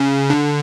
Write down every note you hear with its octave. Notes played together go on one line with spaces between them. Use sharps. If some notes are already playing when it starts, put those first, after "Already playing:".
Already playing: C#3
D3